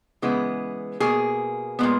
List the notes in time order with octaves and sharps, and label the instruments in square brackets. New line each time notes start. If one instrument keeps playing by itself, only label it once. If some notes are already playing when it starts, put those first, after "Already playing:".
[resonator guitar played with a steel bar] C#3 E3 G#3 B3
B2 A#3 G#4
A#2 G#3 B3